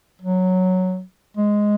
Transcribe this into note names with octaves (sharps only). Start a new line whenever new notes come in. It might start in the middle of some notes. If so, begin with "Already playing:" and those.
F#3
G#3